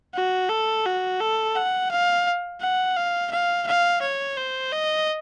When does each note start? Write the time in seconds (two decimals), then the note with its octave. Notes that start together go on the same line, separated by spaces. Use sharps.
0.15 F#4
0.49 A4
0.86 F#4
1.20 A4
1.55 F#5
1.91 F5
2.61 F#5
2.97 F5
3.31 F5
3.67 F5
4.02 C#5
4.37 C5
4.72 D#5